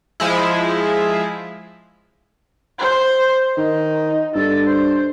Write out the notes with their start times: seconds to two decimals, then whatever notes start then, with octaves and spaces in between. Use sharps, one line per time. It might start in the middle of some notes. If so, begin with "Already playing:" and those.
0.20 F3 G#3 E4
2.79 C5
3.57 D#3 D#4
4.35 G2 A4
4.67 C5